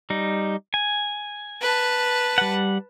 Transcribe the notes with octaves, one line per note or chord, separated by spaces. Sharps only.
G3 D#4
G#5
B4 A5
G3 F#5